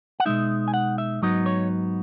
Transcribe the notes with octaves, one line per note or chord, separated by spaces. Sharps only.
F#5
B2 G#3 D#4 E5
G#5
F#5
E5
G#2 F#3 B3 D#4 D#5
C#5